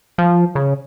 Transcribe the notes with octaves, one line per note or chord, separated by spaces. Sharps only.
F3
C#3